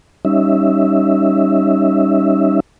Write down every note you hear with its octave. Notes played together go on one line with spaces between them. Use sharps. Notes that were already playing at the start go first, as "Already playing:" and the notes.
G3 C#4 D#4 E5